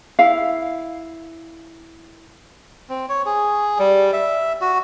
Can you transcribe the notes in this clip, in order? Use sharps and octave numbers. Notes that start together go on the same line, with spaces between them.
E4 F5
C4
C#5
G#4
G3
E5
F#4